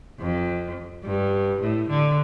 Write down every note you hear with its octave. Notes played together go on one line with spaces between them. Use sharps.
F2
G2
A2
D3